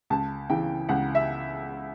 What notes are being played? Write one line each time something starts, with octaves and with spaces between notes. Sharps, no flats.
C#2 A5
C#3 E3 G5
C#2 F#5
E5